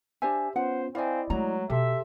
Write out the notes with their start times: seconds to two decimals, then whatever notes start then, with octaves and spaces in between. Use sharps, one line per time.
0.22 D4 G4 C5 E5 G#5
0.56 B3 C#4 F4 C5 F#5
0.95 C4 E4 D5 D#5 F5 G#5
1.30 F#3 G#3 A3 A#5
1.70 B2 G4 A4 E5 C6